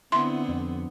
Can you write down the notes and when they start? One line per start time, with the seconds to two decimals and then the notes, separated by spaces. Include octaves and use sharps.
0.12 D3 B3 C4 E4 C6
0.49 F2